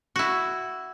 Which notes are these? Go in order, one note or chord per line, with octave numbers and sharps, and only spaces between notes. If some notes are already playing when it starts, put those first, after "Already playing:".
E4 F#4